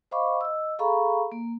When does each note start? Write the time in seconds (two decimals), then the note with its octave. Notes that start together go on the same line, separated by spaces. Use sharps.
0.11 C5 D#5 F5 B5 C#6 D6
0.41 D#5 E6
0.79 G#4 A4 F5 A#5 B5 C#6
1.32 A#3